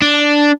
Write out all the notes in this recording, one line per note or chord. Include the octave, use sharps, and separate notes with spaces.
D4